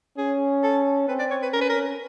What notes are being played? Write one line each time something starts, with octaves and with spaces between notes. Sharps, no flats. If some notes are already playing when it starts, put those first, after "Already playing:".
C#4 G#4
A4
C4 B4
D5
C#5
B4
C#4 A#4
B4
A#4